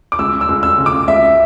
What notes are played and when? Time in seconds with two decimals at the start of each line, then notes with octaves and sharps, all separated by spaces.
0.12 D6
0.19 C#2 E6
0.41 E6
0.49 C#2
0.63 E6
0.78 C#3
0.86 D6
1.08 C#2 E5